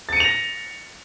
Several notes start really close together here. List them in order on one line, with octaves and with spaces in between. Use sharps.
A6 C#7 D#7 F7 A#6